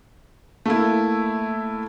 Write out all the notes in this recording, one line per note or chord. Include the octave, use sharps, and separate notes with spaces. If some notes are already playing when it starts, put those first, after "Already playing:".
A3 A#3 E4